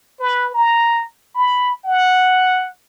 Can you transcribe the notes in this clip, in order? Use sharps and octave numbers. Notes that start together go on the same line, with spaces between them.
B4
A#5
B5
F#5